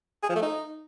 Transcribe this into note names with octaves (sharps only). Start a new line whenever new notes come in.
G#4
F3
A3
D#4